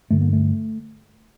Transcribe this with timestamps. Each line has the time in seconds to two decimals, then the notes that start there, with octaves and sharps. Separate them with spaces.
0.10 G2 D3 A3
0.21 A#3
0.33 A3